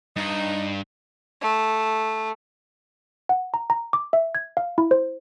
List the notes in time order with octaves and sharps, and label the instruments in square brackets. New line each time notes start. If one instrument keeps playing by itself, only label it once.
[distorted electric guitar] G2 [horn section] D#4
[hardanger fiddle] A3
[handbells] F#5
A#5
A#5
D6
E5
G#6
F5
E4
C5